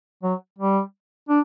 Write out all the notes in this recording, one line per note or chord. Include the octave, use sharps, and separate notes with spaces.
F#3
G3
D4